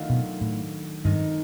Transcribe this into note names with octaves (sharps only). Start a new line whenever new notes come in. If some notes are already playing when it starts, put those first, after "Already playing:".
Already playing: D#3 F#3 A3 D4 F4
B2
A2
G2 D#3 G#3 C4 D#4